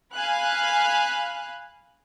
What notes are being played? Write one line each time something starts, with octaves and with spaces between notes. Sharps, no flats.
F5 G#5 B5 F#6